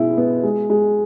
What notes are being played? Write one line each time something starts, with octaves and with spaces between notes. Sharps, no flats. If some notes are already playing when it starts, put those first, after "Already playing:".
Already playing: B2 G#3 E4
B3
G#3
G#3